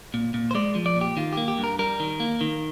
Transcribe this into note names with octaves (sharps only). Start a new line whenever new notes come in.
A#2
A#2
C5
G#3 D5
F3
D5
A#2
G4
D#3 F4
A#3 G4
G4
G2
A#4
G3 A#4
D#3
A#3
D#3